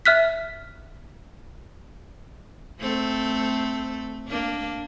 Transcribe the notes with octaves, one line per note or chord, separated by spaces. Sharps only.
E5 F6 F#6 B6
A3 C4 A4
A#3 D4